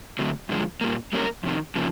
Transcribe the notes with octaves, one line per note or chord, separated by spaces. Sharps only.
D3 F#3 A3 C4
G2 D3 F3 G#3
A#2 G3 A#3
G3 A#3 C#4 F#4 A#4
F2 C3 D#3
C#3 F3 A#3